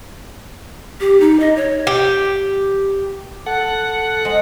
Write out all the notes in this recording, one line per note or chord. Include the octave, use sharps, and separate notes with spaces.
G4
D#4
D#5
C#5
G4
A4 F#5
G#3 C5